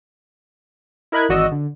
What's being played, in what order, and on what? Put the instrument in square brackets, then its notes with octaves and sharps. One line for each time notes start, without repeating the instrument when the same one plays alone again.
[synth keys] E4 A#4 D#5 B5 F#6 G#6
G#1 E3 F#4 D5 D#5 E6
D3